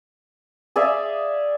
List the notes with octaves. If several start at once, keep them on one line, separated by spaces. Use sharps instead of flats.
G#4 D5 E5 F5